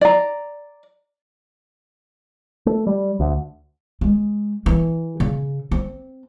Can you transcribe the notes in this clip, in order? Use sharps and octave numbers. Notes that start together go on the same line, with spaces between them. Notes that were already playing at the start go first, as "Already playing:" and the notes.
D5 A#5
A3
G3
D2
G#3
E3
C#3
C4